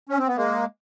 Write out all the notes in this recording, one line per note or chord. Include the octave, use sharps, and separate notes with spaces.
C#4
C4
B3
G#3 A#3